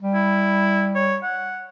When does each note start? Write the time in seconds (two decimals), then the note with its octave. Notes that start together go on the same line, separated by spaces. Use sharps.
0.01 G3
0.14 E4
0.95 C#5
1.23 F#5